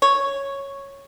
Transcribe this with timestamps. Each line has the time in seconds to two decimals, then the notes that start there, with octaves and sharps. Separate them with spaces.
0.02 C#5